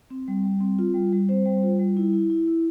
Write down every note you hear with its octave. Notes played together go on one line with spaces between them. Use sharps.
C4
G3
G3
C4
F4
G3
G3
C4 C5
G3
F4
G3
E4
E4
E4
E4